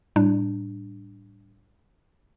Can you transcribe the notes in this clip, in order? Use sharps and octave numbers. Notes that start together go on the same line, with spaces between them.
A2 G3 D4